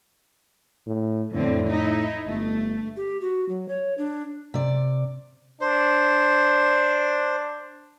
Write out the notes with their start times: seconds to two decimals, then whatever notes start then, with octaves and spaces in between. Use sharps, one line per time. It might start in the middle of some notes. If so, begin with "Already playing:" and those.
0.87 A2
1.33 F2 A2 D3 C4
1.68 D#4 E4
2.26 G1 A3
2.97 G4
3.21 F#4
3.49 F#3
3.69 C#5
3.98 D4
4.54 C3 D5
5.61 D4 C5